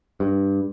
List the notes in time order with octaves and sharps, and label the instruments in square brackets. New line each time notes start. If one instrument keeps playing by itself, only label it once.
[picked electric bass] G2